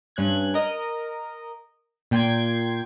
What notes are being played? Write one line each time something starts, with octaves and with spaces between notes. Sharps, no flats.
G2 C#4 F#6 G#6
A#4 D#5
A#2 G5 C6 G#6